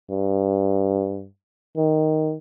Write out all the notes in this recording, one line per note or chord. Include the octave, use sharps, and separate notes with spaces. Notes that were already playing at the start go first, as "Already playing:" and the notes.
G2
D#3